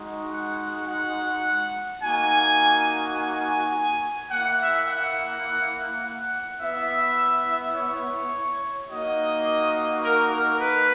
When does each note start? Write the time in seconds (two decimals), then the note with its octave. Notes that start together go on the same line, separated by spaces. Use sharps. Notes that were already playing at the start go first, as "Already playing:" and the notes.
Already playing: G#3 D#4 F#4
0.31 F#5
0.87 F#5
2.02 A#3 D#4 F#4 G#5
3.17 G#5
4.31 A#3 E4 F#5
4.59 E5
4.88 F#5
6.02 F#5
6.59 B3 E4 E5
7.74 C#5
8.88 A#3 D#4 F#4 D#5
10.02 A#4
10.31 A#4
10.60 B4